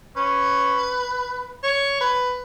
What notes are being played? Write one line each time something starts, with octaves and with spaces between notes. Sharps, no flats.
C#4 B4
C#5
B4